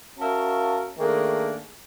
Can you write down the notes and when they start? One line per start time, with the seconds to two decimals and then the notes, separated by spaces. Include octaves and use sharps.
0.19 C#4 F#4 A#4 E5 F5 A5
0.98 D#3 A3 A#3 D4 G#4